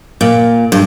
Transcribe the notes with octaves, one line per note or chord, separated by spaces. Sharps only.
A#2
G2